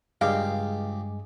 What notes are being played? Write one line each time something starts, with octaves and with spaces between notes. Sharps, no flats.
C#2 G2 G#3 G4 G#4 F5